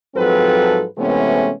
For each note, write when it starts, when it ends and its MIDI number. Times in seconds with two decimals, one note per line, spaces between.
0.15 0.84 44
0.15 0.84 53
0.15 0.84 54
0.15 0.84 60
0.15 0.84 69
0.15 0.84 71
0.98 1.51 48
0.98 1.51 52
0.98 1.51 56
0.98 1.51 57
0.98 1.51 59
0.98 1.51 61